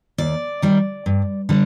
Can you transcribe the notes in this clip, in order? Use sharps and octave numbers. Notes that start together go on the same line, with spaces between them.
D#2 D5
D#3 G3
G2
D3 G3